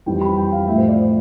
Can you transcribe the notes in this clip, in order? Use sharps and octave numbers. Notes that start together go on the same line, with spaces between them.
F2 E3 G3 G5
B5
G5
F5
A2 F3 A3 E5
C5
D5